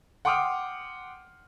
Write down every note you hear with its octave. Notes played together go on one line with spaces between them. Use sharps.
F#5 G5 C6 D6 D#6 F6